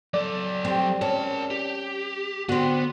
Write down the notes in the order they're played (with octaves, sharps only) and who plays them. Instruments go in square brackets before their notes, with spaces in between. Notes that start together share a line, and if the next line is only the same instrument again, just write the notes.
[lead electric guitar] F#3 A4 [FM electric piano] D5
[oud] G3 C4
[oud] C#4 [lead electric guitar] A#4 A5
[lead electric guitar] G4
[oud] D3 C4 [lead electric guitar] B3 [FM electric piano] F#4